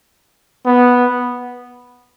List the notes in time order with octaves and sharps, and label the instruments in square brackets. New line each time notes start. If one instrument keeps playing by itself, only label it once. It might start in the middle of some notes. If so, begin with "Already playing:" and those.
[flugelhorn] B3